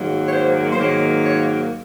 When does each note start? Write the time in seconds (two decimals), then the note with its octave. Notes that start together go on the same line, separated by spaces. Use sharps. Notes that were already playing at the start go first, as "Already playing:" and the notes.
Already playing: G#2 D#3 F#3 A#3
0.27 C#5
0.32 C5
0.72 C5
0.78 G#2 D#3 F#3 A#3 C#5
1.24 C#5